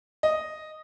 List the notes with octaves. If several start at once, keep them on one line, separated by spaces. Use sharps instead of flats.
D#5